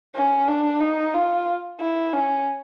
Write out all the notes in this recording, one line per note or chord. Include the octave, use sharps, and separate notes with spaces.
C#4
D4
D#4
F4
E4
C#4